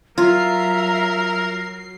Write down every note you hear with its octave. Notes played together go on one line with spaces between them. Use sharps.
F#3 F4 A#4 E5 A#5 E6 C7